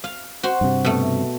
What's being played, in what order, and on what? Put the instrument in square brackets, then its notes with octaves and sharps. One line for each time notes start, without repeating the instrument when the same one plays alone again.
[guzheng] F5
F#4 C5
[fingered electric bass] G2 C3
[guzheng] B2 A3